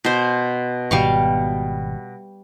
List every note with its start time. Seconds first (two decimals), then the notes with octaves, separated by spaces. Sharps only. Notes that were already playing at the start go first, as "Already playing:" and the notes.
0.05 B2 C5
0.91 G#1 B2 G3 F5 C#6